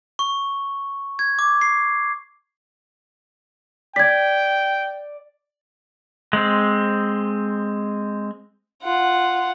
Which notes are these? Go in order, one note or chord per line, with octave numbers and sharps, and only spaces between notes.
C#6
G#6
D6
C7
D5 G5 G#6 B6
G#3 C4
F4 F#5